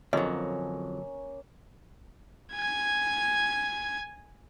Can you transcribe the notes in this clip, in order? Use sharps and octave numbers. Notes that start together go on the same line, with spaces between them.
F2 D3 F#3 A#3 C#4 D#5
G#5 G#6